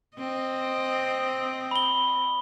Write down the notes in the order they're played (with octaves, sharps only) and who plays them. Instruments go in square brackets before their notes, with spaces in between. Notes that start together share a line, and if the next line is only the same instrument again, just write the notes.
[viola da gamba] C4 D#5
[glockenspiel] B5 G7